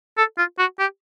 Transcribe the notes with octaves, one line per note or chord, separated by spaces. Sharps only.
A4
F4
F#4
G4